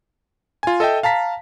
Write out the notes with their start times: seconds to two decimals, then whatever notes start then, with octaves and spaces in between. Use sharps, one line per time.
0.63 F4 G#5
0.80 A4 D#5 E5 G5
1.03 F5 A5 A#5 B6